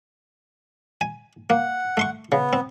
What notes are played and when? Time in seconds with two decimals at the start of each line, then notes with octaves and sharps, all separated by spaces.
1.01 G#5
1.50 A#3 F#5
1.97 A3 C6 C#6
2.32 C#3 B3
2.53 C4